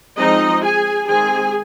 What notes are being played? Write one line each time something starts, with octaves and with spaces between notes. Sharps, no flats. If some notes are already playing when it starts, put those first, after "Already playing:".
F3 G#3 C4 D#4 D#5
G#4 G#5
D#3 G#3 C4 G#4 G#5